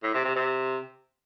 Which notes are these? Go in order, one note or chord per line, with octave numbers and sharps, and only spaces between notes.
A2
C3
C3
C3